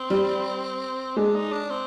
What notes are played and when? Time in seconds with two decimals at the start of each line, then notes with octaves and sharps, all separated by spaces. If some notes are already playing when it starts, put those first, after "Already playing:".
Already playing: C4
0.10 G3
1.16 G#3 D4
1.35 D#4
1.52 D4
1.70 C4